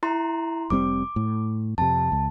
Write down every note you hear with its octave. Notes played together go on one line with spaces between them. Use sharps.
E4 A#5 C6
F1 G3 C4 D6
A2
F2 C3 A5
C#2